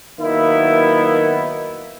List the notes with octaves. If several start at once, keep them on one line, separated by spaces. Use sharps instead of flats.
D#3 F#3 A#3 B3 E4